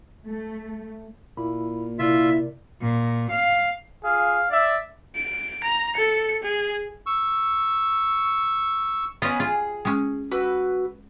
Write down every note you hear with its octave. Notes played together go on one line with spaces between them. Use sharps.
A3
A#2 A#3 E4 B5
C3 E4 F4 A#4 D5 E5
A#2
F5
F4 G#4 F5
D5 E5
D7
A#5
A4 C#7
G#4
C#6 E6
B3 C#4 F4 D#5
F4 G#4
G#3 C#4
F#4 B4 E6